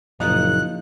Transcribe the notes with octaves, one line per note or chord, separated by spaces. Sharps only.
F#1 A#2 F3 D#4 F#6